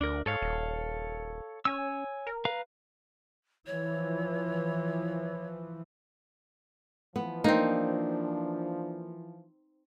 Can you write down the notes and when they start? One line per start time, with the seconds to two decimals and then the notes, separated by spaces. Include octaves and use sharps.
0.01 D2 D4 A#4
0.26 G#2 A4 C#5 F5
0.42 D#1
1.65 C#4 C#5 G#5 E6
2.27 A#4
2.45 B4 F5 A#5
3.67 E3 F3 C#5
7.16 E3 F3 B3
7.44 A#3 C4 D4 D#4